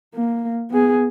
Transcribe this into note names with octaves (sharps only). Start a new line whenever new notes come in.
A#3
B3 G#4